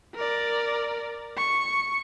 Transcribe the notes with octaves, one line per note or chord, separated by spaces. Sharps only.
A#4 D5
C#6